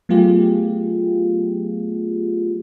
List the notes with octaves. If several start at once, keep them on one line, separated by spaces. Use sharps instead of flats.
F#3 A3 B3 F4 G4 G#4